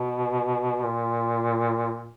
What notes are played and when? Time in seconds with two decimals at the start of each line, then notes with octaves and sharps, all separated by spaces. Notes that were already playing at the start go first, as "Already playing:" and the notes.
Already playing: B2
0.83 A#2